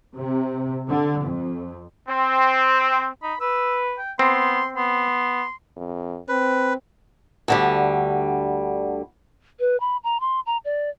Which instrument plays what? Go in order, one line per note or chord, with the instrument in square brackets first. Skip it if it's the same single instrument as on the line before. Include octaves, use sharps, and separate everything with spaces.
[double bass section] C3
D3
F2
[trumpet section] C4
[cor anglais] D#4 [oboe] B5
[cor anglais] B4 [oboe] E6
[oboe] G5
[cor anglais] B3 [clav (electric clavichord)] C4 [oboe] C6
[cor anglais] B3 [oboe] C6
[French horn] F2
[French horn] C4 [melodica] B4
[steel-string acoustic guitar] D2 D3 G3
[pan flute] B4
B5
A#5
C6
A#5
D5